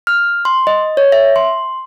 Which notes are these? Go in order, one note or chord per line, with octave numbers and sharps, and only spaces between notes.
F6
C6
D#5
C#5
E5
C6